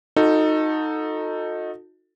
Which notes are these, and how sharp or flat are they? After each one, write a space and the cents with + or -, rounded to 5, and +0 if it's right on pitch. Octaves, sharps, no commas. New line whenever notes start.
D#4 +0 F#4 -35 A4 +15